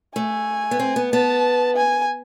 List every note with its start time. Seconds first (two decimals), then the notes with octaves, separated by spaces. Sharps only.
0.15 A3 G#5
0.71 B3
0.80 C4
0.96 B3
1.12 B3 A5
1.76 G#5